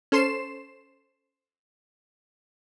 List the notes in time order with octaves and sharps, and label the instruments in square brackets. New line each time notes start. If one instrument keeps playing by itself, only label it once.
[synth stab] C#4 A4 C5 C6 C7 E7